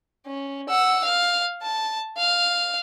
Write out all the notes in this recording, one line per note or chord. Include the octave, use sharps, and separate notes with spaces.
C#4
F#5 E6
F5
A5
F5